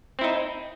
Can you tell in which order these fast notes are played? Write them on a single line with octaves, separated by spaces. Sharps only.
C4 E4 D#4